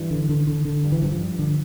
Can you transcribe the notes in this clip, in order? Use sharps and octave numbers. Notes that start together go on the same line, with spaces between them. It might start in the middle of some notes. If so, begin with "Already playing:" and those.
Already playing: G2 E3
D3
D3
D3
D3
G2
E3
G2 F3
G2
D3